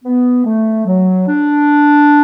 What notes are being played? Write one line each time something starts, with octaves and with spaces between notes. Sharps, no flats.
B3
A3
F#3
D4